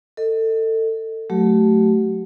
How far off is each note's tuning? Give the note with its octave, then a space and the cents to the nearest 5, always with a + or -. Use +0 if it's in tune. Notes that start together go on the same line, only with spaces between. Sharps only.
A4 +25 D#5 +0
F#3 -10 A3 -5 G4 -45